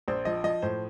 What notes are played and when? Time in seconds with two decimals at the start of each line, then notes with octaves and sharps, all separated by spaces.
0.08 A#1 C5
0.25 F3 D#5
0.44 F3 D#5
0.62 A2 C5